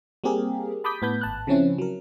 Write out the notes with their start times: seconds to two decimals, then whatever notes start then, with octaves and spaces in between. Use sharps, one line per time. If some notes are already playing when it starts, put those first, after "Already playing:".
0.24 G3 A#3 C4 G4 G#4 A#4
0.84 A5 B5 D6 D#6 G6 B6
1.02 A2 B3 B5 G6
1.21 G#1 A5 F#6
1.47 C#3 F3 C4 C#4 E4
1.78 F#3 A#4